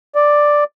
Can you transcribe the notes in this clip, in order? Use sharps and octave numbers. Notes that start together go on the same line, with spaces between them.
D5